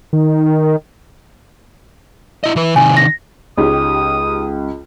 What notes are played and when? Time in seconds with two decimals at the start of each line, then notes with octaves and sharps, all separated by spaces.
0.13 D#3
2.44 E4 D#5
2.56 E3 B4
2.76 C3 D#3 G#5
2.97 A#6
3.57 C#2 C#4 D#4 G4 D#6